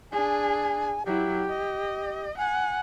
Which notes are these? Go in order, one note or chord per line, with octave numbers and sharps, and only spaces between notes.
D4 G#4 G#5
F#3 E4 G4
D#5
F#5 G#5